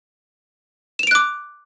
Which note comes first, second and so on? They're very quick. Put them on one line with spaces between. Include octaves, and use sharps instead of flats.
E7 F7 D7 F#6 D6